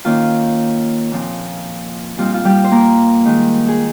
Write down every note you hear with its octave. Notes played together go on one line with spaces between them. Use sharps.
D#3 A#3 C#4 F4
A#2 F3 C4 D#4
A#2 G3 C4 D#4 F4
F4
G3 G4
C5
A#3 A#4
D#3 G#3 D#4
G#4